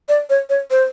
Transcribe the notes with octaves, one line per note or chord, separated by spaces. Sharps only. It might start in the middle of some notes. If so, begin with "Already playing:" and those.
D5
C#5
C#5
C5